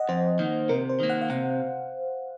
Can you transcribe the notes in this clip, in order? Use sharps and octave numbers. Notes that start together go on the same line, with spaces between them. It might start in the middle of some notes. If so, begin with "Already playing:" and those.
Already playing: D#5 F#5
F2 C5
D#3 A#3
C3 A#4
C5
D#3 A#3
F#5
F5
C3 F#5